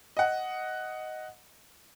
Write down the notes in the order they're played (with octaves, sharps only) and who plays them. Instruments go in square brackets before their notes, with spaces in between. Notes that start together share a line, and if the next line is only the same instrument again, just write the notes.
[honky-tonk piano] D#5 F#5